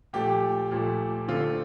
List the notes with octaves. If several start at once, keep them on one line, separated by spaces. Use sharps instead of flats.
A#2 F3 A3 G4
A#2 F3 A3
D3 A3 C4 F4